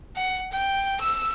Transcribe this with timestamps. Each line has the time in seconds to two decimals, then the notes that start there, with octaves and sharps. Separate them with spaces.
0.16 F#5
0.52 G5
1.01 E6